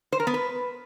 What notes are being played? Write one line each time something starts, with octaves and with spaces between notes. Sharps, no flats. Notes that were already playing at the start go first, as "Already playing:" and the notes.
C5
A#4
B3
B4